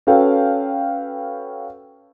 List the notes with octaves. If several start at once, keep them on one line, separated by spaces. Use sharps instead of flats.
C#4 F#4 A4 B4 F5 G5